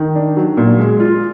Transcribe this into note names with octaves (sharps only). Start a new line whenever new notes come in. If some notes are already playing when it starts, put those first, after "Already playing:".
Already playing: D#3
D4
F#3
A#2
G#3
F4